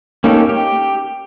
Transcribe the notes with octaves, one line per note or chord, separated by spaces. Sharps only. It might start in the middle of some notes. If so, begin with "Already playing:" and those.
A#3 C#4 D#4 G4 A4
G4